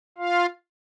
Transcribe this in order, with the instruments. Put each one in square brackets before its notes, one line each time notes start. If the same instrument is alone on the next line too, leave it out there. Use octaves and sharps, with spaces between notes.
[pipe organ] F4 F5